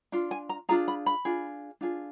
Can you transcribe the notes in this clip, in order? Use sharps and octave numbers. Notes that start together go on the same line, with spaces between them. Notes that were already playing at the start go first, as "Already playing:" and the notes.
D4 F4
G#5
A#5
D4 F4 G#4 A#5
B5
B5
D4 F4 G#4
D4 F4 G#4